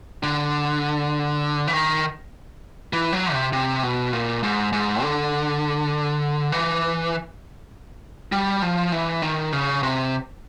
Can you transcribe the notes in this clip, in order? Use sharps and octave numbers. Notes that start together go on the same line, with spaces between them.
D3
E3
D#3
E3
F#3
C3
C3
B2
A#2
G#2
G#2
D3
E3
G3
F3
E3
D#3
C#3
C3